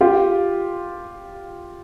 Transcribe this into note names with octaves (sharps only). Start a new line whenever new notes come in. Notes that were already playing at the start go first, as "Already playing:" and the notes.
F4 G4